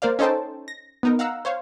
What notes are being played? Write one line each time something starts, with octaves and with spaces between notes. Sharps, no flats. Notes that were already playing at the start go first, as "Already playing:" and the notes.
A#3 A#4 C5 D5 F5
C#4 D#4 A4 C5 G5 A5
A#6
B3 D#4 A#4
F5 F#5 A#5 E6
C5 C#5 F5